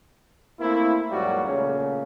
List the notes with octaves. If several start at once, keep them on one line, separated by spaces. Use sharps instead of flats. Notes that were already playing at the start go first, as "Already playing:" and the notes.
A3 A#3 C4 E4
E2 G#2 F#3 G3 A#3 F#4
A#2 C#3 A3 C#4